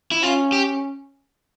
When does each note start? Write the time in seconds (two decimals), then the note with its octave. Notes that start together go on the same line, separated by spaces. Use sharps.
0.11 E4
0.23 C#4 F4
0.52 G4